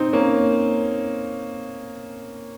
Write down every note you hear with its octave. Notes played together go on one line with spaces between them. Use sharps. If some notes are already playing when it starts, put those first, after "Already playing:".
Already playing: C4 D#4
A#3 C#4